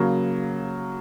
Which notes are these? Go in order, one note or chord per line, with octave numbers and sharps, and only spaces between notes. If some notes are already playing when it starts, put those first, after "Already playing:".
Already playing: C#3 F#3 A#3